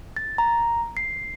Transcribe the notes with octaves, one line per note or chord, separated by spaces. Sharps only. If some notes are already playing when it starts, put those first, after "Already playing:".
A6
A#5
C7